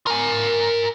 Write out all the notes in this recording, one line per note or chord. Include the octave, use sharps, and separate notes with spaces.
A#4 G#5